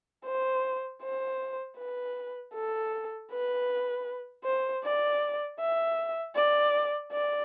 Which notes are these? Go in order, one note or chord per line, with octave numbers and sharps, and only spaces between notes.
C5
C5
B4
A4
B4
C5
D5
E5
D5
D5